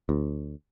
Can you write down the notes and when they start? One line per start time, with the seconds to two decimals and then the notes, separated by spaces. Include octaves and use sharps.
0.09 D2